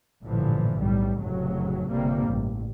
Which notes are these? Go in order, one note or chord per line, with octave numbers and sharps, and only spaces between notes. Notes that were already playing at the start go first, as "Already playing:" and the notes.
A1 G2 A#2 D3 E3 F3
B1 A2 G3
F1 A2 C#3 F#3
G1 C#2 G2 C3 G3 A#3
A1